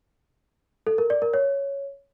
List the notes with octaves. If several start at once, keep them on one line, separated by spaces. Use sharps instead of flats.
A4
A#4
D5
A#4
C#5